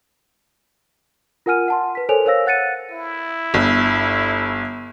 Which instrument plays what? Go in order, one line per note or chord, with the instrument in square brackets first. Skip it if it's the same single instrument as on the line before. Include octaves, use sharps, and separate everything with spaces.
[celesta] F4 A#4 F#5 G#5 F6 D#7
F#5 A5 C6
B4 B6
A4 A#4 C5 C#5 G#5 F7
A#4 C5 C#5 F5 E6 A#6
F#5 F#6 A6 C#7 D#7
[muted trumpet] E4
[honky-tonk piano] G1